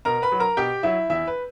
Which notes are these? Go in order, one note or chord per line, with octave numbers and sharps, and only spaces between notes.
B2 A#4 A#5
B4 B5
F#3
A#4 A#5
B2 G4 G5
F#3 E4 E5
E2 E4 E5
B4